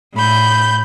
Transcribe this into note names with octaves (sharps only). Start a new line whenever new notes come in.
A2 B5 G6